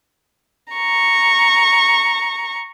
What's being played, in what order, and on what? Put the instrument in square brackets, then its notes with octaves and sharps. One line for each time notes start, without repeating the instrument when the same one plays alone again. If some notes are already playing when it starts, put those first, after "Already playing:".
[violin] A#5 C#6